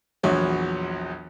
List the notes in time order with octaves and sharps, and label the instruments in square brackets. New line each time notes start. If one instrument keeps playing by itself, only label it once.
[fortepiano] A#1 E2 F#3 C#5